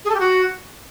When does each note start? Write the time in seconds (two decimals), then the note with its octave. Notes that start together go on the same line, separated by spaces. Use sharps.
0.05 G#4
0.10 A4
0.15 G4
0.20 F#4